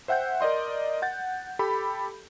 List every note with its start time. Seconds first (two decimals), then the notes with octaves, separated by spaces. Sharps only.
0.08 C5 E5 F#5 G5 G6
0.41 A#4 D5 D#5 C6
1.02 F#5 G6 A6
1.59 G4 A4 B5